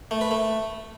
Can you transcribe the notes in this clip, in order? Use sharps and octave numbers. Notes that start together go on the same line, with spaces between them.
A3
B4
A3